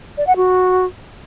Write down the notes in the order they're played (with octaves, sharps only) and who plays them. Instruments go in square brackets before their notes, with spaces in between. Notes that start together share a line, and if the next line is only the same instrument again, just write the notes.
[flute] D5
F#5
F#4